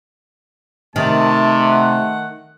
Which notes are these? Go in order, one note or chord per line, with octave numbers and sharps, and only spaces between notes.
C3 D#3 A3 A5
F#5